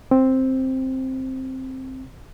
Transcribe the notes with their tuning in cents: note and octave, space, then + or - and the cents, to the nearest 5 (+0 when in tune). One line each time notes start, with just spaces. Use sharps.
C4 +5